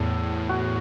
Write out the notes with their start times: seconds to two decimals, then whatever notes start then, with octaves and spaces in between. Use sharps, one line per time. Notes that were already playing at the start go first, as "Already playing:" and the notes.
Already playing: E2 A2 A4
0.49 F#4